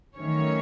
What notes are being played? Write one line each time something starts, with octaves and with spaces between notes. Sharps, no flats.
D#3 F#3 A3 C#4 C#5